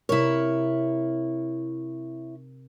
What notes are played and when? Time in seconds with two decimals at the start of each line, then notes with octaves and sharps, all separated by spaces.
0.09 C3 E4 A#4 C#5